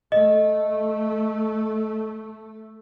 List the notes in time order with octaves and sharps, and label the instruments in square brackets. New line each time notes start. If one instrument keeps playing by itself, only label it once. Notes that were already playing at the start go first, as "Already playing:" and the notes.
[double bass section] A3 [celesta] D#5